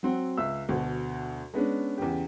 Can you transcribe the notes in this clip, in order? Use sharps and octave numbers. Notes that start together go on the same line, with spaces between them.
F#3 C4 F#5
C#2 E5 E6
D2 B2
G#3 B3 C#4 D4
E2 C#3 G4